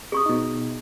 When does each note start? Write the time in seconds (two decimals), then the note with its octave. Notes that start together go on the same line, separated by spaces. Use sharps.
0.12 G#4 C#6 D#6
0.26 B2 D#4